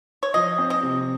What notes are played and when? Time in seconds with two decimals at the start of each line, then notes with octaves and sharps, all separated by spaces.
0.23 C#5
0.34 F3 D#5
0.58 C4
0.70 D#5
0.83 C3